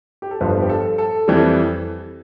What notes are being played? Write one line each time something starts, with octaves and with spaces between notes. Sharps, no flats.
G4
A4
G1 G2 F3 B4
G4
A4
A4
F2 E3 G3